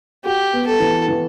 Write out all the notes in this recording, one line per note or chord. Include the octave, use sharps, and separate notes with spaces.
F#4 G4
B3
A4
E3
E3